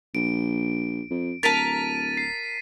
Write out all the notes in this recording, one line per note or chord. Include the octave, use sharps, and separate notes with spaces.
A#1 D7
F2
D1 A#4 A5 A6 B6 D#7
C7